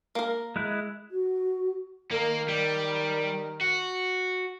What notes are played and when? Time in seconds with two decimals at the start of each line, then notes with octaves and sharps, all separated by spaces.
0.15 A#3 A#4
0.56 G#3 E4 F#6
1.11 F#4
2.11 D#3 A#3 A#4
2.48 G3
3.61 F#4